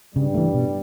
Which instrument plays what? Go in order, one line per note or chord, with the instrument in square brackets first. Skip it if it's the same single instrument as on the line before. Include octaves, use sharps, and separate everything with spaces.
[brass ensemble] G2 G3 [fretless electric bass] C#3
[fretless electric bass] E3 A3
B2